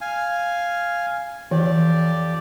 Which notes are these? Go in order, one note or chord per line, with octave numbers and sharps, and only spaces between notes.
F5 G#5
F2 E3 G4 D5